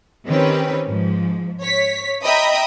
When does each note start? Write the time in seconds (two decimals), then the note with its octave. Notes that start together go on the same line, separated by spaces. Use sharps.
0.27 D#3 C4 C#4 G4 B4
0.86 G#2 F3
1.61 C#5 B6
2.24 D#5 E5 G5 A#5 B5 D#6